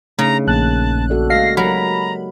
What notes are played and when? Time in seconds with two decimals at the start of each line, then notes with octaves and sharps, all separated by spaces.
0.19 C#3 A3 D4 D#4 A#5
0.47 A#1 A#3 A5 F#6
1.10 F#4 A4 D5
1.30 G#3 F#4 D#5 F5 A#6 C7
1.57 F#3 G4 A#4 A#5 B5